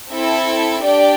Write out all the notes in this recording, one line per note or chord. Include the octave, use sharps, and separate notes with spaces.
C4 E4 A4 E5
D4 G4 D5 G5